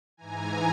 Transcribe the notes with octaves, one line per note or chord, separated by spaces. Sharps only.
G#2 E3 G#5 A#5